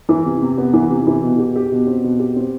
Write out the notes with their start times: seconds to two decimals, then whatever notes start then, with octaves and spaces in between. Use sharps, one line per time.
0.09 E3
0.26 C3
0.42 C3
0.58 B3
0.73 E3
0.90 C3
1.07 E3
1.23 B2
1.38 G4
1.56 G4
1.72 B2
1.87 C4
2.04 B2
2.19 G4
2.36 C4